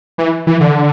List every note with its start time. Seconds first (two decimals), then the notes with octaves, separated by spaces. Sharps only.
0.18 E3
0.47 E3
0.60 D3